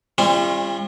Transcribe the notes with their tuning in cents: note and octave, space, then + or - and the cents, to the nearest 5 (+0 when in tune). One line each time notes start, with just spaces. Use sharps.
G3 +40 C#4 -45 F4 -30